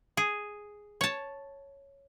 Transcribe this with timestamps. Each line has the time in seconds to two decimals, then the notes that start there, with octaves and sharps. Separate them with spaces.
0.17 G#4
1.01 C#5 A5